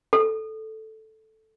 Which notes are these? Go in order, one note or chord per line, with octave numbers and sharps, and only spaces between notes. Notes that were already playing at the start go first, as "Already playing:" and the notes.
A4